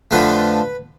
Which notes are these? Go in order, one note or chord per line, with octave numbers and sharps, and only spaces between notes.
F2 D3 F3 A3 B4